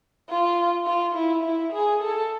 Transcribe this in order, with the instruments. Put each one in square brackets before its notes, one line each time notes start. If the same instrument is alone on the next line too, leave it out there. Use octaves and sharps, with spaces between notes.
[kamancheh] F4
F4
E4
E4
G#4
A4